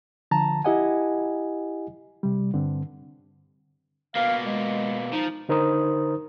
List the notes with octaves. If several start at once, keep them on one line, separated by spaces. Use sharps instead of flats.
D3 F3 A5 A#5
E4 G4 D#5 F#5 G#5
C3 G3
G2 D3 C4
B2 A#3 F5
G#3
F3 D#4
D3 D#4 A#4 C5 A#5 D#6